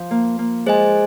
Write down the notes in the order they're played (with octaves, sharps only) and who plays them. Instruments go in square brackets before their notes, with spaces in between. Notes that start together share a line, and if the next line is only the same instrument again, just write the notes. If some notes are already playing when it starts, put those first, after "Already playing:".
Already playing: [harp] F3
A#3
A#3
[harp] G#3 [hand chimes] G#4 C5 D#5 G#5